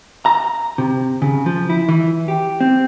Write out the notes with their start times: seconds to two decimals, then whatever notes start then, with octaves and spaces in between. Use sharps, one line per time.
0.26 A#5
0.78 C3
1.22 C#3
1.46 F3
1.70 E4
1.89 E3
2.28 G4
2.61 C4